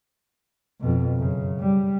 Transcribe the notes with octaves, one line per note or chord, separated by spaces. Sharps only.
F2 B2
F#2 C#3
G3